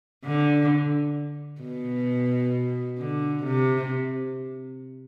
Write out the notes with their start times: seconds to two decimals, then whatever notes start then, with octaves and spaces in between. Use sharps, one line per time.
0.25 D3
1.61 B2
2.98 D3
3.44 C3